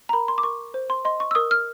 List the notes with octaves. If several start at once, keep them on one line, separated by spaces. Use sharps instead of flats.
A#5
A#4 B5
C6
D6
A#4 C#6
C5
C6
D#5 C6
C#6
E6
A#4 D#6
F6